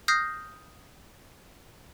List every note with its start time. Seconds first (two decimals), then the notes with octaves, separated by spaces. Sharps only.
0.08 D#6 F6 G6 A#6 C7